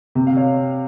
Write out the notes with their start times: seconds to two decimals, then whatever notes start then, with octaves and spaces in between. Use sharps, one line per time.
0.15 C3
0.27 F5
0.37 C#5